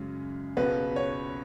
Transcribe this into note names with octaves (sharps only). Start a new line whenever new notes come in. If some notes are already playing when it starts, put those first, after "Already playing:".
Already playing: F#2 C#3 G#3
C#2 B2 B3 B4
C#5